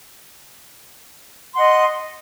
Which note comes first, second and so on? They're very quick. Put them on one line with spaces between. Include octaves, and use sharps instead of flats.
C6 F#5 D#5